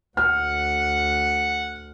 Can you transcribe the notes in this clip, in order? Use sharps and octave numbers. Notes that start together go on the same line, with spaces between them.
D2 F#5 F6